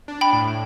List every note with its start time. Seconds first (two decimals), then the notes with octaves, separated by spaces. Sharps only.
0.08 D4
0.21 G5 B5
0.33 A2